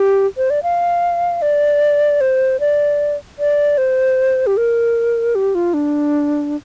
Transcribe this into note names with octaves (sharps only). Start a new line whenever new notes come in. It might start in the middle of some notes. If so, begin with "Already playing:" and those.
Already playing: G4
C5
D5
F5
D5
C5
D5
D5
C5
G4
A#4
G4
F4
D4